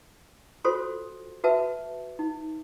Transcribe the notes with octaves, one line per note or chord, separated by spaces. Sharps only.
F4 F#4 A4 C5 C#5 C6
F#4 B4 E5 A5
D#4